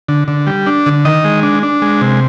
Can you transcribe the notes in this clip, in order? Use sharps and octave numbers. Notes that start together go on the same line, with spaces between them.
D3
D3
G3
D4
D3
D#3 D#5
G#3
D4
D4
G#3
C3